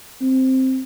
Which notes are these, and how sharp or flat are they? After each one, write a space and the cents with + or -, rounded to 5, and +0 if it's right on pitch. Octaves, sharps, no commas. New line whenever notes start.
C4 +0